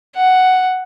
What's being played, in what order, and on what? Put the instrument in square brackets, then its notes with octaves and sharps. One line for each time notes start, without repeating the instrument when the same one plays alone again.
[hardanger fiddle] F#5